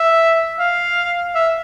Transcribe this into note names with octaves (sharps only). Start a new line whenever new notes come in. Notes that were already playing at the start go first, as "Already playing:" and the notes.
Already playing: E5
F5
E5